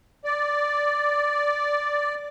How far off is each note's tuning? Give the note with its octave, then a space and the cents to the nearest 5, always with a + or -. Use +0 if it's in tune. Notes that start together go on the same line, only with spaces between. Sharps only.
D5 -5